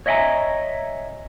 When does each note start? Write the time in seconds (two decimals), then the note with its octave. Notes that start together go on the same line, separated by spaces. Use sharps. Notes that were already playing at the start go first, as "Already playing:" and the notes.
0.06 C#5 D#5 E5 G5 G#5 A#5